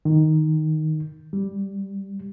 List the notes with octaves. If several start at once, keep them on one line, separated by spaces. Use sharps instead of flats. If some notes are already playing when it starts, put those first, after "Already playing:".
D#3
G3